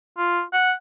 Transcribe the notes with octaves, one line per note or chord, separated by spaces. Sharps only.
F4
F#5